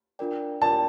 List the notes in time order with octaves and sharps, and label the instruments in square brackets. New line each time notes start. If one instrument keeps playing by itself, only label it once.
[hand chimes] D4 F4 A#4 D5 G5
[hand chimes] D4 F4 A#4 D5 G5 [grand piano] A5